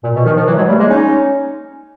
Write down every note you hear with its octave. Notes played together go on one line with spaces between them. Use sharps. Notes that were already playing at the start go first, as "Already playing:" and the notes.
A#2
B2
D#3 F3
D#3 F3
E3 F#3
F#3 G#3
G3 A3
G#3 A#3
C#4 D#4